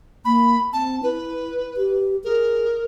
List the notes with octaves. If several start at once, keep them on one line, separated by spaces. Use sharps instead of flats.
A#3 B5
C4 A5
E4 B4
G4
G#4 A#4